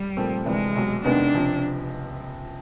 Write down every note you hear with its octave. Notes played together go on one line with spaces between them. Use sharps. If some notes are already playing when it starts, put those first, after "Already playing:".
Already playing: G3
A#2 F3 A3 C4
D2 C3 E3 G#3 A3 D4
C2 B2 F#3
E2 C3 D#3 G#3 B3 D4
C#2 C3 F3